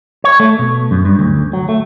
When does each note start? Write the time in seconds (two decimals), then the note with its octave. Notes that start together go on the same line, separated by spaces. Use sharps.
0.24 C#5
0.40 A3
0.59 B2
0.91 F#2
1.05 G2
1.19 D2
1.53 F#3
1.69 A3